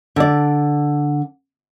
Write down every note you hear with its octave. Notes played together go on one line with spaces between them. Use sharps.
D3 D5